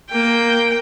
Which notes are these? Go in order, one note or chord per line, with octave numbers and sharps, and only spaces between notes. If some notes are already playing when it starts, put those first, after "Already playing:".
A#3 G5